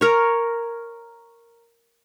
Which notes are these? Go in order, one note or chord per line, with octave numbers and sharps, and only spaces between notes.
A#4 C#5